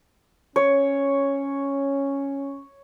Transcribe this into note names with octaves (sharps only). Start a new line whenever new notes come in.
C#4 C#5